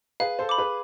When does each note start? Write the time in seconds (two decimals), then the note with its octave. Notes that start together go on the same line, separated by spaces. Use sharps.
0.20 G#4 B4 F5
0.39 A4 C5
0.49 B5 D6
0.58 G#4 B4